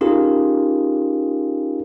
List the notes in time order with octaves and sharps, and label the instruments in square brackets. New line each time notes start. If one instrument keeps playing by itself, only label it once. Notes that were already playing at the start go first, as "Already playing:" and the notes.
[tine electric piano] C#4 D#4 F4 G4 G#4 A#4